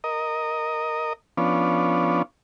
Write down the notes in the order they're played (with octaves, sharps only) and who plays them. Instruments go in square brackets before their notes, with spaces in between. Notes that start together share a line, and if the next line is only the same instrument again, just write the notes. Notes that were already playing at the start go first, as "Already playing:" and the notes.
[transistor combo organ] A#4 D#5
F3 B3 C#4 D4